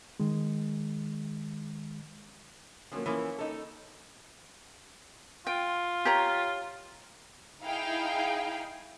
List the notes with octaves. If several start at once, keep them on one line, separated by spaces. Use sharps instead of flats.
D#3 G#3
D3 F3 F#3 A#3 C#4
E3 F3 A#3 C#4
D#4 A4
F4 G5
G4 C#5 A#5
D#4 E4 G#4 F5 G5